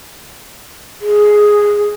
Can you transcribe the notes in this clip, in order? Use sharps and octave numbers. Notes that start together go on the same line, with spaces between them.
G#4